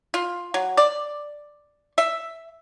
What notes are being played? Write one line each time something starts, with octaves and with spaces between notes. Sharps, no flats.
F4
F#3
D5
E5